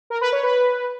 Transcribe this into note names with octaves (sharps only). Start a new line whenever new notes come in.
A#4
B4
C#5
B4